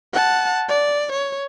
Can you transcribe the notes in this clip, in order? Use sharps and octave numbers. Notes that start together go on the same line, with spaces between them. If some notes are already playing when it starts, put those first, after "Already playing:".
F#5 A5
D5
C#5